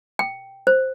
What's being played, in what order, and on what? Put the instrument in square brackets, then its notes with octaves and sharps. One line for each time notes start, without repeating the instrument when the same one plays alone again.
[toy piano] G5
C5